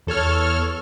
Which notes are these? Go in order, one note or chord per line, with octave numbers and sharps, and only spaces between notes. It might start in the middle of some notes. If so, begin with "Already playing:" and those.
E2 A4 C#5 F6